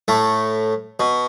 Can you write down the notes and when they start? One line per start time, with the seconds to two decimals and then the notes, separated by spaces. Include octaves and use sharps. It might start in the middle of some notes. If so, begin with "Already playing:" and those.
0.08 A2 A3
1.00 B2